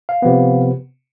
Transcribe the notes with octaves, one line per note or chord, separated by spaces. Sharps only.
F5
C3 F3 B3